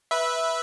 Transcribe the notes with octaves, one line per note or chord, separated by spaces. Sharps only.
B4 E5